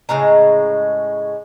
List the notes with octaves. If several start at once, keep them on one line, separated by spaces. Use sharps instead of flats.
A2 C#3 G#3 A#5